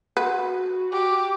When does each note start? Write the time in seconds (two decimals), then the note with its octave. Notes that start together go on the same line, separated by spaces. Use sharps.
0.17 F#4 B4
0.92 G4 D6